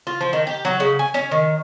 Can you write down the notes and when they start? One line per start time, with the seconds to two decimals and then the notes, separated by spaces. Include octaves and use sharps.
0.07 F4
0.21 F3
0.33 D#3
0.47 G4
0.65 F#3
0.80 C#3
0.99 G#5
1.14 C#4
1.31 D#3